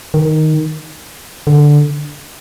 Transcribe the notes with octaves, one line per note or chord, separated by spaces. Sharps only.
D#3
D3